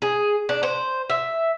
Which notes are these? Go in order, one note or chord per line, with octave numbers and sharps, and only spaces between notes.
G#4
D4
C5
E5